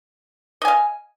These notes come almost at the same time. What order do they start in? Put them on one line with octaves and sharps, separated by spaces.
D#5 G#5 F5